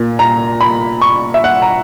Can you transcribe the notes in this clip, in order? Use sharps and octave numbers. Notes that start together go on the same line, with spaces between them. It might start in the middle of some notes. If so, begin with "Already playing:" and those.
Already playing: A#2
A#5
B5
C#6
E5
F#5
A#5